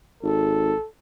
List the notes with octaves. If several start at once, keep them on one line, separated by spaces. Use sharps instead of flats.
G#1 A4